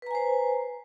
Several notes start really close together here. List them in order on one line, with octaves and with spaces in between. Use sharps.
B4 A#5 G#5 C5